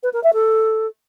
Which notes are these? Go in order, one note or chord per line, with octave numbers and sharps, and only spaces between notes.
B4
A#4
E5
A4